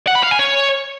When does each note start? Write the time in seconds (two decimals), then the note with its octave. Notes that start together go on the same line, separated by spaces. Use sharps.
0.08 F#5
0.16 B5
0.24 F5
0.31 G#5
0.39 C#5